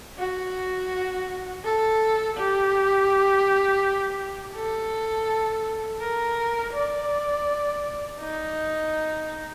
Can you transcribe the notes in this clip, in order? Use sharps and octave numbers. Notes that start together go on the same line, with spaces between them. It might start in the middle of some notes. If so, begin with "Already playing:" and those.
F#4
A4
G4
A4
A#4
D5
D#4